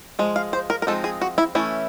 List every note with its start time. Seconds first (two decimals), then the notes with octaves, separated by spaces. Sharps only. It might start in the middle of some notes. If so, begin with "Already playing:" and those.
0.19 F3 G#3
0.36 F5
0.53 C5
0.70 A#4
0.82 A#4
0.87 F3 G#3 C4 D#4 A4
1.04 G#4
1.21 F#4
1.38 E4
1.55 E3 A3 C#4 E4